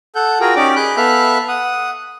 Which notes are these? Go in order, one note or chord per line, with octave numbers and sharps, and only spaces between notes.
A4 F#5 G6
F4 F#4 G#4 A#4 G5
C#4 D#4 G4 D5 D6
G#4 B5 F#6 G6
B3 A4 E5 F5 B5 F#6
F#5 D#6